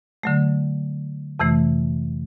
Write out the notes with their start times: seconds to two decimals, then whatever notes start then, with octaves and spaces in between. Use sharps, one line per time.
0.23 D3 F#3 A3
1.39 F2 C3 E3 A3